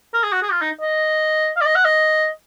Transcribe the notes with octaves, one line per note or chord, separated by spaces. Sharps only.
A#4
G#4
F#4
G#4
F4
D#4
D#5
F5
D5
D#5
F#5
D#5